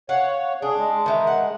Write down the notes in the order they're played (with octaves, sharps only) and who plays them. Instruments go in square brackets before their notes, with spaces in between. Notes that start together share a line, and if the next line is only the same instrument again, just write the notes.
[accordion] C#5 [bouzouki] F5 F#5
[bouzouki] D4 [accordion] G#4
[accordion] G#3
[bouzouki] D#3 E3
F#5